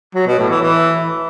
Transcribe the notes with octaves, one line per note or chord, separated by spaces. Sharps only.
F#3
B2
A2
E3
E3